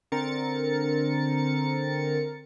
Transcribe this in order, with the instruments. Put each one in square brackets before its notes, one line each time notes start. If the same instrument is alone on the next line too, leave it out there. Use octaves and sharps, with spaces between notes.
[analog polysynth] D3 C4 A#4 A6 C#7